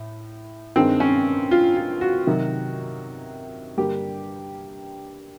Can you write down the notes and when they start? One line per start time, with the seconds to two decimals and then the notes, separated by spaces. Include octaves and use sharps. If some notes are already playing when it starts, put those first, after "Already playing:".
Already playing: A2
0.76 G2 D#3 G#3 C4
1.00 C#4
1.51 F4
1.76 F4
2.01 F#4
2.27 C3 D#3 F#3
3.77 G2 D3 G3 A#3 G4